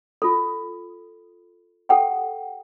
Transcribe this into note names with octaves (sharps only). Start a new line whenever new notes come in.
F4 A4
G4 A4 F#5 G5